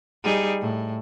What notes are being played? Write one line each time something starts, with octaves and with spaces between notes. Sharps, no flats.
G3 D#4 G#4
A2